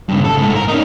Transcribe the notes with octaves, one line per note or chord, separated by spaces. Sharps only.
G2 C#3
A4
G#2 A3
A#4
C#4 D#4